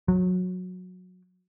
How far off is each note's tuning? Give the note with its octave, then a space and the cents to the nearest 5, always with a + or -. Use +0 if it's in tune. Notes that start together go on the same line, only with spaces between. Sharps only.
F#3 -20